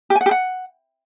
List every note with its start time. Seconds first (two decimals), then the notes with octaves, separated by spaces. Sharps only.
0.10 G4
0.15 G#5
0.21 F#5
0.26 G4
0.31 F#5